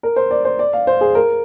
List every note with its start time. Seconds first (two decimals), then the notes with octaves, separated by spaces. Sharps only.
0.03 A#4
0.16 C5
0.31 D5
0.45 C5
0.59 D5
0.73 F5
0.87 C5
1.01 G#4
1.15 A#4